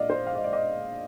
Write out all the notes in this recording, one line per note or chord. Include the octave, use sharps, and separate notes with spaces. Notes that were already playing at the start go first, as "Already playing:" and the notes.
Already playing: A#2 G#3 D5 D#5 F5
C5
F5
D#5
D5
D#5